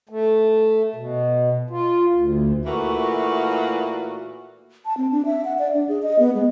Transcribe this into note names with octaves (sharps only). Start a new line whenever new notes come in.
A3
B2
F4
D2
A#2 E3 A3 A#3 F#4
A5
C4
D4
E5
F#5
D5
D4
G#4
D#5
B3
G#3